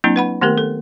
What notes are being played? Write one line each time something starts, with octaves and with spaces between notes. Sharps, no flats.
F#3 A#3 C4 D4 E4
B4 F#5 B5
D#3 A3 B3 G4 A#4
A4